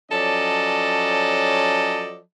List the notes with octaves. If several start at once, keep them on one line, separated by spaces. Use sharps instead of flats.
F3 F#3 C#4 A4 D5 D#5